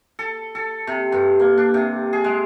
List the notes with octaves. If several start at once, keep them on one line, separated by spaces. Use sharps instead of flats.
A4
A4
C3
G2
A#3
D4
C3
G#4
G#3